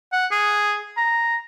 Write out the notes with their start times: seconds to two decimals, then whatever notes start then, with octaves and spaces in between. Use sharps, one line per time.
0.12 F#5
0.31 G#4
0.97 A#5